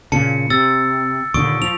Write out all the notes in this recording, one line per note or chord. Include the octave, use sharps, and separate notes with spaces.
A#2 C#3 A5 C#7
C3 E6 A6
D#2 A#2 D3 C#6 D#6 D7
F3 F7